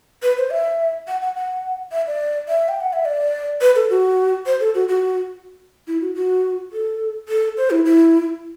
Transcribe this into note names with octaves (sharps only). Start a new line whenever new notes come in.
B4
C5
E5
F#5
F#5
F#5
E5
D5
E5
G5
F#5
E5
D5
B4
A4
F#4
C5
A4
F#4
F#4
E4
F#4
F#4
A4
A4
C5
E4
E4